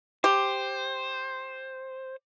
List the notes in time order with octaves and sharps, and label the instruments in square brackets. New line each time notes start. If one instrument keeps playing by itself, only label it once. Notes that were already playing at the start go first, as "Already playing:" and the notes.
[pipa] G4 [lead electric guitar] C5